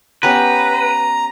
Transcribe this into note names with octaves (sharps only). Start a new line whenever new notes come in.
B3 C#4 G4 B4 A#5